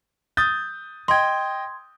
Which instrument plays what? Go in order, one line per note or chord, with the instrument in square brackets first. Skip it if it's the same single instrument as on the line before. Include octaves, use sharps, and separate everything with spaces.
[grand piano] D#6 G6 A6
[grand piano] D#5 G5 [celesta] C6 G#6